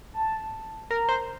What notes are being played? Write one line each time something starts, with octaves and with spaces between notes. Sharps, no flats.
A5
A#4 A#5
C5